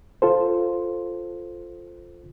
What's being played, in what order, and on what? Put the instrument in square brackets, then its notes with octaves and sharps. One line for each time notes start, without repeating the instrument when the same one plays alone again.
[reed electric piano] F4 A4 C5